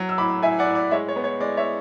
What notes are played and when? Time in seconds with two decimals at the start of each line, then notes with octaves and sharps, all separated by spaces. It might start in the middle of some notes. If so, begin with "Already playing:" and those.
Already playing: F#3
0.09 E6
0.18 A2 B5 D6
0.43 A2 E5 G#5
0.59 D5 F#5
0.67 A2
0.75 D5
0.91 G#3 C#5 E5
1.08 C#5
1.16 B3
1.24 C#5
1.40 G#3 D5
1.57 C#5 E5